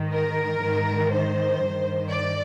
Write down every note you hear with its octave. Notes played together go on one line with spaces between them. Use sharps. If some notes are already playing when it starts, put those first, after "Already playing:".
Already playing: G#2 D#3
A#4
G#2 D#3
C5
G2 D#3
D5